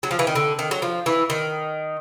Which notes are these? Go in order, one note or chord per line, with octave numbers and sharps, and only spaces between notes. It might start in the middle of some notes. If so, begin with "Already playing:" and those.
F#3
F3
E3
D#3
D3
D#3
F#3
F3
E3
D#3